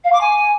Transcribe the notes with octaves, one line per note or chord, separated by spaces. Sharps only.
F5
D6
G#5